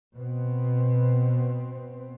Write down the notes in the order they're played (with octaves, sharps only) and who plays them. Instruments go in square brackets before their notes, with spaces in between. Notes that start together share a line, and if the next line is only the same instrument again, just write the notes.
[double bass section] B2 B3 C4